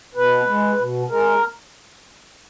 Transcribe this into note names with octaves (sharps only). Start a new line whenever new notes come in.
B2 B4
G#3
B2
G#3 A#4